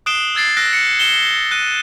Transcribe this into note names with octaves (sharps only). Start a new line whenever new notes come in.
D#6 F#6 C7 D7 E7 G7
E6 G#6 A6 C7 D7
E6 F#6 A#6 D7
C#7
D7 E7 G7
F#6 D#7